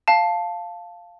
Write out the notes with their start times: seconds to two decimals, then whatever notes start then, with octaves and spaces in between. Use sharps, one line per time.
0.08 F5 A5